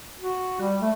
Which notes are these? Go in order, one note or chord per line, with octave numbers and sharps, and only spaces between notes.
F#4
G3
A3